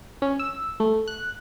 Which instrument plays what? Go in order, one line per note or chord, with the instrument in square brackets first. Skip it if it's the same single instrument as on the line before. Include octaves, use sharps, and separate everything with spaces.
[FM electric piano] C#4
E6
A3
F#6